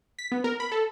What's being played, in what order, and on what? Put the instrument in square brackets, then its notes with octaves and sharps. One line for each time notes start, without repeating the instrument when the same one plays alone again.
[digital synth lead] B6
B3
A#4
B5
A4